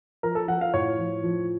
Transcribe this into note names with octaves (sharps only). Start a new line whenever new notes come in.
F3 A#4
A4
F3 F#5
F5
A2 C#5
F3
F3